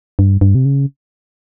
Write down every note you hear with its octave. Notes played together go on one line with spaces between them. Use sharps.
G2
G2
C3
C#3